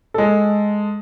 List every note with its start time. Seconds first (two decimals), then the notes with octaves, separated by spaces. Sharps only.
0.14 G#3 A4